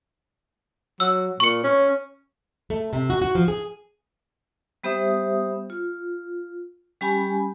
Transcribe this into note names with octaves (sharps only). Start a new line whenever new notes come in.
F#3 E6
A#2 C#6 C#7
C#4
A3
C3
F#4
F#4
F3
G#4
G3 B3 G4 C5 E5 D#6
F4
G3 C#4 G4 G#5 B5